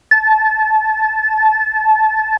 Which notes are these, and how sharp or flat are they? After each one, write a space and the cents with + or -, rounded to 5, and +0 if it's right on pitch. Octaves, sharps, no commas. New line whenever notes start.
A5 -20